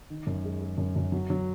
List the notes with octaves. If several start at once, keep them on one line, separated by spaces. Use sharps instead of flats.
D#3
F#2
G#3
G#3
F#2
F#2
F#3
F#3